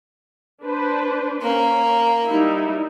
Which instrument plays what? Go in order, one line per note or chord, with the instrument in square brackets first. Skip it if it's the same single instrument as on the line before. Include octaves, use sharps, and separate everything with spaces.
[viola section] D4 B4 C5
[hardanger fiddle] A#3 A#4 [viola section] C#4
[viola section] G3 D#4 E4